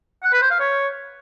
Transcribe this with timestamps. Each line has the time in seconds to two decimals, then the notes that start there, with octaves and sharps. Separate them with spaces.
0.23 F#5
0.32 B4
0.41 C5
0.51 F5
0.60 C#5